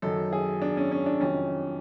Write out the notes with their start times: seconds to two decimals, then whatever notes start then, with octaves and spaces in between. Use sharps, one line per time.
0.02 F#2 D#3 F#3 A4
0.33 G#4
0.62 D4
0.77 C#4
0.91 C#4
1.06 D4
1.21 F2 C3 D#3 F#3 C#4